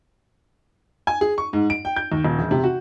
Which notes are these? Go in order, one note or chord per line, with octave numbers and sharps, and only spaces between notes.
G#5
G#4
C#6
G#2
D7
G5
G6
D#2
D#1
E1
C3
F#4